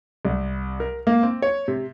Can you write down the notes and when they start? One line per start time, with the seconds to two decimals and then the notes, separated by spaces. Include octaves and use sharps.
0.25 C2
0.80 A#4
1.07 A#3
1.23 C4
1.42 C#5
1.68 C3